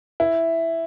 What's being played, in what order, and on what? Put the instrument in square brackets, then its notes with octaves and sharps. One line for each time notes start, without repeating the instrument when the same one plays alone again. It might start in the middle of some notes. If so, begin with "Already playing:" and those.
[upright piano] E4